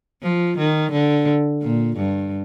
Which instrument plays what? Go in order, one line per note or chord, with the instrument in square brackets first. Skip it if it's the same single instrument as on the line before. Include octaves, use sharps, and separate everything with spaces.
[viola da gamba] F3
D#3
D3
A#2
G2